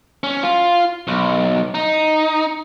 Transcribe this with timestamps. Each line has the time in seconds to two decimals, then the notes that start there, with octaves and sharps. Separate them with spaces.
0.24 C#4
0.43 F4
1.07 B1
1.75 D#4